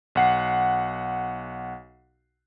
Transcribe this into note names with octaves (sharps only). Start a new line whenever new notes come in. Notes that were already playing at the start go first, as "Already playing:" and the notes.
B1 F#5 C7